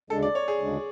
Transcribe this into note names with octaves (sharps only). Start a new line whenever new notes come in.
D2 C#3 G#3 D4 A4
D5
C#5
G#4
D2 C#3 G#3 D4